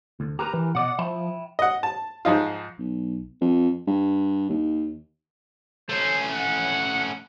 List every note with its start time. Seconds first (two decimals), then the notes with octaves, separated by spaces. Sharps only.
0.20 D2
0.39 G4 A#4 B4 A#5
0.53 E3
0.75 B2 D5 D#5 F#5
0.99 F3 E5 G5 B5
1.59 D#5 F#5
1.83 A5
2.25 G#2 F3 D#4 F4
2.79 B1
3.41 F2
3.87 G2
4.50 D#2
5.89 A3 C#4 C5
6.33 F#5